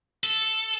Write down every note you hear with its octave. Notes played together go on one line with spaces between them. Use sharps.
A4